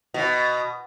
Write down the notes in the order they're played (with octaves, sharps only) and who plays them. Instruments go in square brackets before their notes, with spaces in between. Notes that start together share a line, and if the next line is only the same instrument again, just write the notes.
[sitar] B2